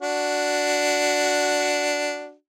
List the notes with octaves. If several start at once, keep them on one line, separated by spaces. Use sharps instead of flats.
D4 F#4